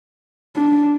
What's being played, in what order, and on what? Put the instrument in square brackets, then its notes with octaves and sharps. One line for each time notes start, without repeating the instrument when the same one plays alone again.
[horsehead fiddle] D4